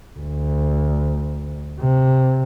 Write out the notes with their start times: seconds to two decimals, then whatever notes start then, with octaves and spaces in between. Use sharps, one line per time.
0.18 D2
1.81 C3